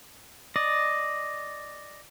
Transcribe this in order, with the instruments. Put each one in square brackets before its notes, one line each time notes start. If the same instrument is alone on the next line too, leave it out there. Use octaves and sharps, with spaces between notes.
[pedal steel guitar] D5 D#5